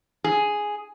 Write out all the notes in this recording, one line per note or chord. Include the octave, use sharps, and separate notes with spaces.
G#4